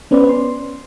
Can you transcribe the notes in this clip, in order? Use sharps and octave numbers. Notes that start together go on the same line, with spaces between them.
B3 C#4 B4 C5 D5
C6